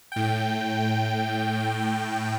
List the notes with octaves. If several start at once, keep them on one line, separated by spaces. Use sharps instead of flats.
A2 G5